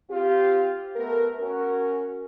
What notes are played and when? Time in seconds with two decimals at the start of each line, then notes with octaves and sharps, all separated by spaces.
0.10 C4 F4 G4
0.96 A3 B3 A#4
1.40 C#4 F#4 A#4